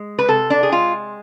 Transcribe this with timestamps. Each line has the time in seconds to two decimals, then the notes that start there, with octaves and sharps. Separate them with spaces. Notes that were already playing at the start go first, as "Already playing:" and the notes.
Already playing: G#3
0.19 B4
0.28 C3 A4
0.50 D4
0.63 G#4
0.72 G#3 F4